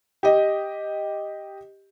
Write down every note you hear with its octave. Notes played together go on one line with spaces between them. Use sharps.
G4 D#5